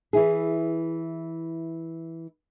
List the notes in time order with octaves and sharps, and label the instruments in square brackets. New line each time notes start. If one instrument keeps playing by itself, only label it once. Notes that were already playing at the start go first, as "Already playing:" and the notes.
[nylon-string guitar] E3 E4 G#4